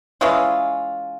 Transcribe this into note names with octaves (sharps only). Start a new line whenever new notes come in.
E3 G#3 C#4 F4